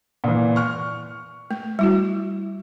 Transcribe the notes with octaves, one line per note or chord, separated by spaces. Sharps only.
A#2 E3
C#6 F6
A3
G3 E4 F#4